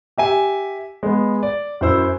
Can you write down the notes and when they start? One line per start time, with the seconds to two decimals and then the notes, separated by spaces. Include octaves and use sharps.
0.18 G4 E5 G#5
1.03 G#3 B3
1.43 D5
1.81 F#2 E4 C5 E6